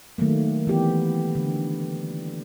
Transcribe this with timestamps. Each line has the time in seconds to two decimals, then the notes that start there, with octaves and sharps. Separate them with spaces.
0.18 D#3 F#3 A3 A#3
0.67 E3 B3 G4
1.35 D3